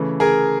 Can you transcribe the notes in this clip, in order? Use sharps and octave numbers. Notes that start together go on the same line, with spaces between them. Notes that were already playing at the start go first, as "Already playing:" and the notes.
Already playing: C#3 E3 A3
G#4 A#4